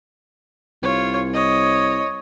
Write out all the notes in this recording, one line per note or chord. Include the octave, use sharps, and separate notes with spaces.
C2 F4 C#5
C#5 D#5